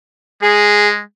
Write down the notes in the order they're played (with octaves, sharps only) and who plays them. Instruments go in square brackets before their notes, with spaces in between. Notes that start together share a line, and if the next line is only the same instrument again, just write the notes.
[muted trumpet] G#3 [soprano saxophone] G#4